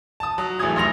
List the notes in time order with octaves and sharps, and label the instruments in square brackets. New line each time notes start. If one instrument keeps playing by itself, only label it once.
[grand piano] A5 D#6
F#3
A1 E3 A3 G#4 D#6 G#6
F1 C6 A#6 F7